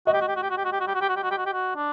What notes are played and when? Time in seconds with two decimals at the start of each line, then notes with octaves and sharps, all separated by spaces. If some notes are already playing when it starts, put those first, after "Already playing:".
0.07 F#4 D#5
0.13 G4
0.21 F#4
0.28 G4
0.36 F#4
0.43 G4
0.50 F#4
0.58 G4
0.65 F#4
0.72 G4
0.80 F#4
0.87 G4
0.95 F#4
1.01 G4
1.09 F#4
1.16 G4
1.23 F#4
1.31 G4
1.38 F#4
1.46 G4
1.53 F#4
1.76 D4